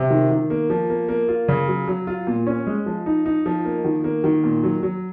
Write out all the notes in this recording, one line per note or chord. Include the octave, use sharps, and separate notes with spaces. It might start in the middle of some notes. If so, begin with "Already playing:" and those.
Already playing: C3
D#3
D#3
A#3
F3
A#3
A#3
F4
C#3
F#3
F#3
F4
A#2
C#4
G#3
F3
D#4
D#4
F3
A#3
D#3
A#3
D#3
A#2
F#3
F#3